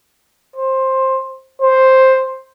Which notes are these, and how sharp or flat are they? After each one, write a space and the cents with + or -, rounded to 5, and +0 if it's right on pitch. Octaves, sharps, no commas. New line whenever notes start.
C5 +15
C5 +5